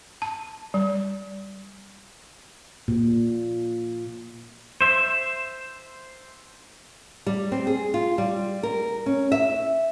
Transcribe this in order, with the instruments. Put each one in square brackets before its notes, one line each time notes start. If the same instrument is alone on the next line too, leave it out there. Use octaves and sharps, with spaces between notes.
[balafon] A5
G3
[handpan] A#2
[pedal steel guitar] C5 E5
[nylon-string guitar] G3
C4
G#4
F4
G3
A#4
C#4
E5